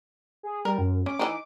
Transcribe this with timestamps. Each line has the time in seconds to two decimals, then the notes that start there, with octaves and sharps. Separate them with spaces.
0.43 G#4
0.65 G3 A#4
0.79 F#2
1.06 C#4 D6
1.19 E3 D4 D#4